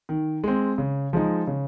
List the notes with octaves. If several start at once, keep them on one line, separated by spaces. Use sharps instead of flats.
D#3
G#3 C4
C#3
F3 G#3 D#4
C#3